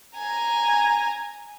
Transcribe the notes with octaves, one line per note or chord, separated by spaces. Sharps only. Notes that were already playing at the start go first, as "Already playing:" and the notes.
G#5 A#5